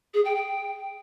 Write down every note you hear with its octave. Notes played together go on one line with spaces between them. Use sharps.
G#4
G5
G5